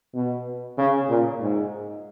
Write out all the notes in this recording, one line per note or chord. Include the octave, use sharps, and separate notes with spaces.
B2
C#3
A#2
G#2